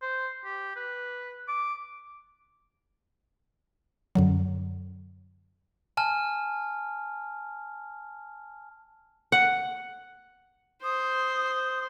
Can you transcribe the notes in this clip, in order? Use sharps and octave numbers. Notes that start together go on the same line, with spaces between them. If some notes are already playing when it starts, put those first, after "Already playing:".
C5
G4
B4
D6
F#2 D3 F#3
G#5 A5 F6
F#5
C5 D#6